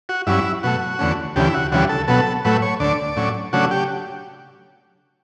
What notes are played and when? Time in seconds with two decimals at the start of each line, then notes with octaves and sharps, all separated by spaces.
0.09 F#4
0.27 G2 F#3 C#4 E4
0.63 B2 F#3 A3 F#4
0.99 E2 D3 A3 C#4
1.36 D2 C#3 E3 G4
1.50 E4
1.54 F#4
1.72 D2 C#3 E3 G3 F#4
1.89 A4
2.08 B2 F#3 B3 A4
2.45 A2 F#3 A3 B4
2.62 C#5
2.80 D2 D3 A3 D4 D5
3.16 A2 F#3 C#4
3.53 C#3 F#3 A3 D4 F#4
3.71 G4